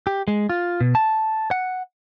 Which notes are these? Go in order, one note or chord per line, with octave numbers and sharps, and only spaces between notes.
G4
G#3
F4
B2
A5
F#5